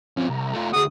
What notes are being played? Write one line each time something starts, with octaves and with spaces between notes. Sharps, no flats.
F3 C4 C#4
C2 A#5
A3 F4
D2 F#4 G#4 D#6